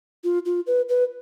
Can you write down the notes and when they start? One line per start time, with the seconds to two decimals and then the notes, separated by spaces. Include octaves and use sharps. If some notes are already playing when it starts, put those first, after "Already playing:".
0.24 F4
0.46 F4
0.67 B4
0.89 B4